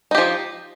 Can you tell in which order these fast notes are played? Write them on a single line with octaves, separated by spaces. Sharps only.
D#4 G4 F3